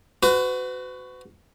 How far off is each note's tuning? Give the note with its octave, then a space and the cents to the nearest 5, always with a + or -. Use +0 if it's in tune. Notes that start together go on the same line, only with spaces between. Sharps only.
F#4 +0 B4 +40